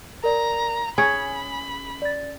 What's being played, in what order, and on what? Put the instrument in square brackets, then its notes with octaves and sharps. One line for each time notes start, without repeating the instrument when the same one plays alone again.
[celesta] A#4 D5 [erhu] A#5
[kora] C#4 G#4 C#5 [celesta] G#5 [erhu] B5
[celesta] D5 A6